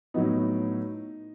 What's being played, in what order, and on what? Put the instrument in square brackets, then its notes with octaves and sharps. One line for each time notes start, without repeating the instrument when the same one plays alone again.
[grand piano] A2 F#3 B3 D#4